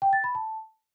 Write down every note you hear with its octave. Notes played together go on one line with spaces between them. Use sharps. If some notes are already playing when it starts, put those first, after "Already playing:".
G5
A6
B5
A5